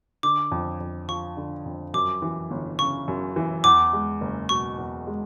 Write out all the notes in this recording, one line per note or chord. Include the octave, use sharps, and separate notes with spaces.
D3 D6
F2
F2
F3 C#6
D3
F2
F#2 D6
E3
G1
C#3 C#6
F#2
E3
E2 D6
G#3
F#1
B2 C#6
E2
G#3